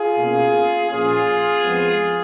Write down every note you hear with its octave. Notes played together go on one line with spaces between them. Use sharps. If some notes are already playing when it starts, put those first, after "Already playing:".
Already playing: F4 G#4
B2 A#3 C#4
A#2 F3 A#3 C#4 F4 G#4
F2 F3 G#3 B3